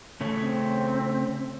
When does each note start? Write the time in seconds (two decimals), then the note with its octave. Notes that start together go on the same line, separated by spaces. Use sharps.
0.21 C#3 A3 C#4
0.40 C4